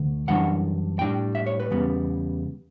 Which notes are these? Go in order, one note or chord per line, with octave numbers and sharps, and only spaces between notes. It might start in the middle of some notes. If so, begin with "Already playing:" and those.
Already playing: D2 D3 A3
F#2 E3 G3 D4 F#5
A2 G3 D4 G5
E5
C#5
B4
E2 C#3 G3 B3